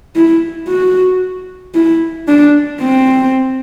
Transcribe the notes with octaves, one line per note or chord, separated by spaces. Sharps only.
E4
F#4
E4
D4
C4